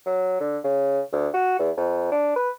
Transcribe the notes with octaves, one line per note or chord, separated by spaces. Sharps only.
F#3
D3
C#3
D2
F#4
E2
F2
D4
B4